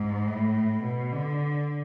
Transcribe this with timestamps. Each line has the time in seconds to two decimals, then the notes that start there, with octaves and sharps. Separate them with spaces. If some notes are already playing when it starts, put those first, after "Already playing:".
Already playing: G#2
0.27 A2
0.84 B2
1.13 D3